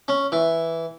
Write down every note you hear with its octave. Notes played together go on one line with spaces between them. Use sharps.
C#4
E3